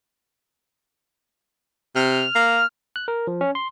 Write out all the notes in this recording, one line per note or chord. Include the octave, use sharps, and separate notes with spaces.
C3 F6
A#3
F#6
A#4
F3
C#4
C6